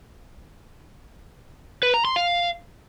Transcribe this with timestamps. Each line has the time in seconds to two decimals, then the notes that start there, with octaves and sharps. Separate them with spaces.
1.83 B4
1.94 A#5
2.05 C6
2.16 F5